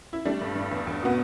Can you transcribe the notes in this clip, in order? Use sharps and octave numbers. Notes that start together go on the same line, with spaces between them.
E4
G3 A3 D4
G2
G2
E2
E2
B2 B3